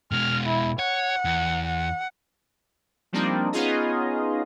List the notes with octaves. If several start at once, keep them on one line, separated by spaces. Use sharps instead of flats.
B2 G#3 F6
E4
C#5 F#5
E2
F#5
F3 G3 A#3 C4 D4 D#4
B3 C#4 D#4 F4 G#4 D#5